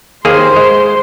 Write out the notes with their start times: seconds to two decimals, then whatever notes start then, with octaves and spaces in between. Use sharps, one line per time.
0.25 D#2 A#3 G#4 C5 C6
0.56 G#3